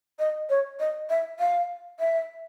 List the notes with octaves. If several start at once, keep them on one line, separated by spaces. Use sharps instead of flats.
D#5
C#5
D#5
E5
F5
E5